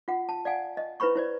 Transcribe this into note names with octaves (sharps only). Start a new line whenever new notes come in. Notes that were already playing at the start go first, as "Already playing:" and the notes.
F4 F#5
A5
D5 F5 F#5 G#5
D#5
E4 B4 C5 B5 C#6
E4 C5 D5